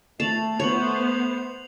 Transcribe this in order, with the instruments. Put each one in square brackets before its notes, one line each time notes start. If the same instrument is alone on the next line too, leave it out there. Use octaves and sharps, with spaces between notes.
[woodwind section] A3 [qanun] A5 [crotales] C7 F7 F#7
[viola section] B3 C5 [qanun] C#5 [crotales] F7 F#7